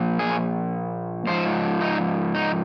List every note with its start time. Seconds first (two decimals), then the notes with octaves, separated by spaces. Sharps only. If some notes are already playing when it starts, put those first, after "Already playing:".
Already playing: A#2 F3 A#3
0.19 G#4
1.27 G#2 F3 C5
1.81 D#4
2.34 D#4